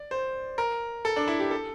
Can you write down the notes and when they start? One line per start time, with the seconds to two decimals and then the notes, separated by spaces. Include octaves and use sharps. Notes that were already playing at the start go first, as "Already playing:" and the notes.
Already playing: D5
0.11 C5
0.58 A#4
1.05 A4
1.16 D4
1.28 E4
1.40 G4
1.51 A4